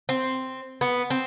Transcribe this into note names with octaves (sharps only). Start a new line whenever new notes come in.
C4
B3
C4